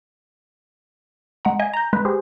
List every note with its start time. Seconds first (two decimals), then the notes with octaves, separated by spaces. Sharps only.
1.45 G#3 F#5 A#5
1.60 D#5 G#5
1.73 A#5 G6
1.93 G#3 B4
2.05 G4 G#4 C5